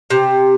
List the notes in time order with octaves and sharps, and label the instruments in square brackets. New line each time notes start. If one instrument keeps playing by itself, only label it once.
[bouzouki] C3